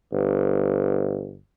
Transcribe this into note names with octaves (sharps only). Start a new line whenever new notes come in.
G1